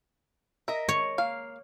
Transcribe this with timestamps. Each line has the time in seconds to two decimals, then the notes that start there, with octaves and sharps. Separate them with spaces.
0.68 A#4 D#5 E5
0.89 C#5
1.18 A#3 F5